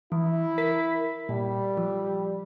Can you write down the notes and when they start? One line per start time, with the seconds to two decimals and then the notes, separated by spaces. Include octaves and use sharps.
0.12 E3 E4
0.58 A#4 B6
1.29 A#2 G3
1.77 F3